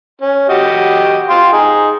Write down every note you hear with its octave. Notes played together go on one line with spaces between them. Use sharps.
C#4
F#4 G4 D#5
F5 G5 C6
D#4 G#4